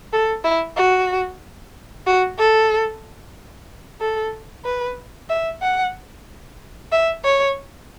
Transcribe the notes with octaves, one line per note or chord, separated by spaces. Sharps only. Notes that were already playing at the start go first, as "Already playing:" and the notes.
A4
E4
F#4
F#4
A4
A4
B4
E5
F#5
E5
C#5